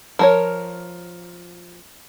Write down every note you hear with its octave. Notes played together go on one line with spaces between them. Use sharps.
F3 A#4 C#5